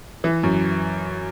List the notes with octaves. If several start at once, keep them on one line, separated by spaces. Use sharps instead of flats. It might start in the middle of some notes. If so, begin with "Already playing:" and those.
E3
F#2